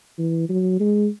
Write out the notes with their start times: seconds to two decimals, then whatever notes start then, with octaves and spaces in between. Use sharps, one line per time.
0.18 E3
0.49 F#3
0.80 G#3